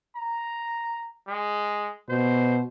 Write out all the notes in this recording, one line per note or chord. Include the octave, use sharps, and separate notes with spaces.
A#5
G#3
B2 C5